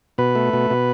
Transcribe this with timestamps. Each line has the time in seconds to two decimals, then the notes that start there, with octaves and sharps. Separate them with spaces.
0.18 B2 B4
0.35 A3
0.53 B2
0.70 B2